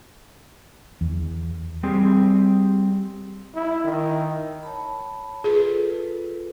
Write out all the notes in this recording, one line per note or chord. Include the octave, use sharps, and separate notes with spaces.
E2
G3 C4 G4 G#4
E4
D#3
C#5 A5 B5
F4 G#4 A4 B4